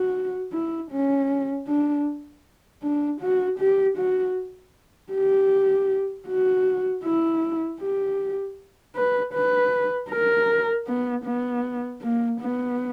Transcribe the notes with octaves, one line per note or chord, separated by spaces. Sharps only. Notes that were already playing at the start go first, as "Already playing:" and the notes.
Already playing: F#4
E4
C#4
D4
D4
F#4
G4
F#4
G4
F#4
E4
G4
B4
B4
A#4
B3
B3
A#3
B3